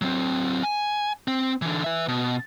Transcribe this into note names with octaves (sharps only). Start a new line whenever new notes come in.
F#3 C4
G#5
C4
D3 E3
B4 E5
B2